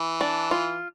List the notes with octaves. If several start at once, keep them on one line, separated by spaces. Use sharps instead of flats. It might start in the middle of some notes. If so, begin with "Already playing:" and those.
Already playing: E3
D4
F4